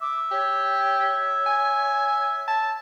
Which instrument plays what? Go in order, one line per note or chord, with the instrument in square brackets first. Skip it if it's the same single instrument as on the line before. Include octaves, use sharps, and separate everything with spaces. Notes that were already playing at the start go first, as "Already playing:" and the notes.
[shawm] E5 [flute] D6
[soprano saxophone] G4 [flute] C#5
[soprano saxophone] G#5
A5